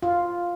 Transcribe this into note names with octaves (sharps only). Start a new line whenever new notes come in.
F4